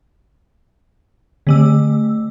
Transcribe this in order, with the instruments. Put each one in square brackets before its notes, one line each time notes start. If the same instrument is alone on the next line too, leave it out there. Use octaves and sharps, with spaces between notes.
[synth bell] D3 A3 E6